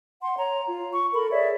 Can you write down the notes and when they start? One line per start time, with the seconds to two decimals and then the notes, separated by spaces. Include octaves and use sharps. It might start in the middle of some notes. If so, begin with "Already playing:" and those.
0.21 F#5 C6
0.38 C#5 A#5
0.66 F4
0.91 C#6
1.13 A4 A#4 B5
1.30 G#4 C#5 D5 E5